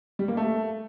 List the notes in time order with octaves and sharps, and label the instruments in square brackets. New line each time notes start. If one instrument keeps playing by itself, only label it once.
[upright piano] G3
A#3
A3